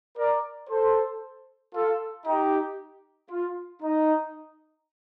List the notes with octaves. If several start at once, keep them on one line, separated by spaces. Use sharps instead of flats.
A#4 D5
A4 C5
F4 A4
D#4 G4
F4
D#4